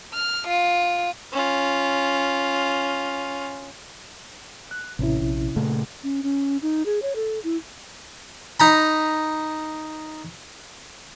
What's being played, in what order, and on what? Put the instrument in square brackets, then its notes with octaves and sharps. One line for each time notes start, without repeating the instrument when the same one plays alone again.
[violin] F6
F4
[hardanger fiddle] C#4 F4
[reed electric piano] F#6
[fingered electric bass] A1 [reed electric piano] C3 C#4 E4
[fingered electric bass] A#1
A#2 C#3 A3
[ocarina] C#4
C#4
D#4
G#4
C#5
A4
E4
[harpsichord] D#4 A#5 B5